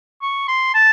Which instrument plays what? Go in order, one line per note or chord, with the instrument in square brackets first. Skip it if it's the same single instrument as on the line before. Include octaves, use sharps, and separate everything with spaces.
[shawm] C#6
C6
A5